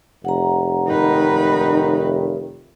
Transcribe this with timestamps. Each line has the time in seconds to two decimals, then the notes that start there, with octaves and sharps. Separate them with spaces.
0.25 F1 F#5 A#5
0.87 D#3 D#4 B4